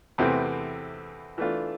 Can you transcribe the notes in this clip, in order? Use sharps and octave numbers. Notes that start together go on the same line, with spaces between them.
E2 C3 E3 A3 C4
E3 A3 D4 F4